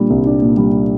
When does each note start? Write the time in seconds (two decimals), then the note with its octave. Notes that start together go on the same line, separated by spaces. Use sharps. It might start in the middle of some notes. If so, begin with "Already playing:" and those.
Already playing: A#2 G3 D4
0.10 C2
0.26 D4
0.42 A#2
0.57 G3